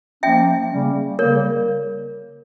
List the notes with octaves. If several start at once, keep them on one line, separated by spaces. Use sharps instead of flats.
F3 A#3 C#4 E5 G5
C#3 G3 A#3 C#4
C#3 G3 A#3 A#4 C#5